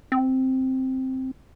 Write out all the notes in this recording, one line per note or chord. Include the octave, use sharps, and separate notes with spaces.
C4